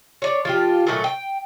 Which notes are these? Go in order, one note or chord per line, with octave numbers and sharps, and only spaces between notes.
D4 C#5
F3 F4 G4
A#2 D#3 F#3 A3
G5